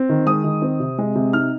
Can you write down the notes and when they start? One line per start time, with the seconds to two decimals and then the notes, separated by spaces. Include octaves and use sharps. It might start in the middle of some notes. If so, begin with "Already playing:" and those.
Already playing: C4
0.09 D#3
0.27 G#3 D#6
0.44 D#3
0.62 C4
0.80 C3
0.98 G#3
1.15 C3
1.33 D#4 F6